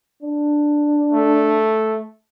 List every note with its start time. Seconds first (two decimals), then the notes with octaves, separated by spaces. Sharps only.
0.22 D4
1.13 A3